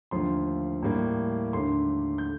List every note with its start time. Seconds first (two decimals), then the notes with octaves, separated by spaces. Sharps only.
0.11 D#2 D3 F3 A3 C6
0.83 A2 G3 A#3
1.53 D#2 D3 A3 C6
2.18 G6